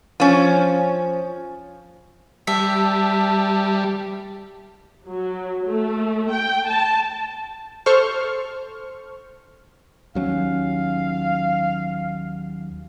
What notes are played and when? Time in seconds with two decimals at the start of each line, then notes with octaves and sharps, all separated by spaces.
0.20 F3 C#4
2.47 G3 E5 A5
5.08 F#3
5.66 A3
6.31 G5
6.66 A5
7.86 A4 C5 C#6 F6
10.15 D#2 F#3 C#4 F5